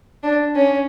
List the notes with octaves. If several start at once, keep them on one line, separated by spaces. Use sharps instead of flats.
D4
C#4